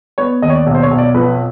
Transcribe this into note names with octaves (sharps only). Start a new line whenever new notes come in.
B3 C#5
D#2 D#5
C#5
D5
B1
C5
C#5
B1
D5
F2 B4